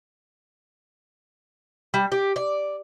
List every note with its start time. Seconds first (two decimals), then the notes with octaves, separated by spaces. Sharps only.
1.94 G3
2.12 G4
2.36 D5